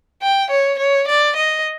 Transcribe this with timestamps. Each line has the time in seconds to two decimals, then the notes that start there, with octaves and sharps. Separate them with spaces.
0.22 G5
0.50 C#5
0.79 C#5
1.08 D5
1.36 D#5